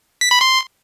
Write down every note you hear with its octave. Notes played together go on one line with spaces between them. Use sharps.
B6
B5
C6